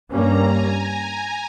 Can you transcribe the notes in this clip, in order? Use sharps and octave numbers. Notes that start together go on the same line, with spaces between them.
G2 G3 A#3 C#4 A#5
G#5